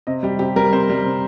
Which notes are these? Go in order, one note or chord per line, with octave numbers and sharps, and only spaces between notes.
C3 D#5
G3 G4
C3 G4
G3 A#4
C3 C5
G3
C3